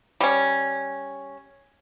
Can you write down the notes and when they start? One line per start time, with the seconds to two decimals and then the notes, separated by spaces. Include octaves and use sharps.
0.21 G3 C#4